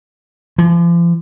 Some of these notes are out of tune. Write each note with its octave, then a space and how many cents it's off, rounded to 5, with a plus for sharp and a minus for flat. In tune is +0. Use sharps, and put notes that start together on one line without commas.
F3 -40